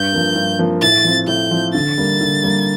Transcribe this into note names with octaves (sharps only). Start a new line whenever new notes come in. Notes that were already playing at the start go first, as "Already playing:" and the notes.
Already playing: G2 G6
F3 A#3
G2
F3 A#3
A2 A6
F3 C4
A2 G6
F3 C4
D3 A6
G3 A#3
D3
G3 A#3